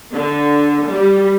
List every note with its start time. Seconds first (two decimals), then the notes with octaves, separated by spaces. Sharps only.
0.13 D3
0.87 G3